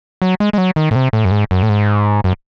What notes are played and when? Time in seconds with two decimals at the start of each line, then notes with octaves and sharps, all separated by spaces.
0.22 F#3
0.40 G#3
0.53 G#3
0.58 F#3
0.76 D#3
0.91 A2
0.96 C3
1.13 A2
1.25 F#2
1.31 G#2
1.51 F#2
1.63 A2
1.69 G#2
2.24 F#2